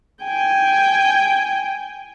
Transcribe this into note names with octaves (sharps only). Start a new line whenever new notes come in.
G5 G#5